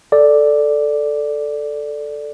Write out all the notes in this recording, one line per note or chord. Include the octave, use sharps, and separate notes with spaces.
A4 D5